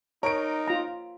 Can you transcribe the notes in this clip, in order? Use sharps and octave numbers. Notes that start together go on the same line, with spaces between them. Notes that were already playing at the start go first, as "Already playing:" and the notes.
D#4 A#4 C#5 D7
F4 A#5